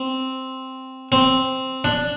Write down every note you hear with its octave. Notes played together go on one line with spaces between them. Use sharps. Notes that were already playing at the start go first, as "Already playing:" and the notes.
Already playing: C4
C4
D4